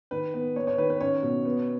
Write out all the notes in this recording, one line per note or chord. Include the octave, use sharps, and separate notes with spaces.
D#3 B4
B3
B3 C#5
C#5
D#3 B4
B4
C#4 C#5
B2
B3